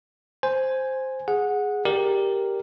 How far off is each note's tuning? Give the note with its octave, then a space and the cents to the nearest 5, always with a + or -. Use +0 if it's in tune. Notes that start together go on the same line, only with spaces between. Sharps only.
C5 +0 G#5 +0
G#4 +0 F#5 -15
G4 +0 A#4 +0 D5 +0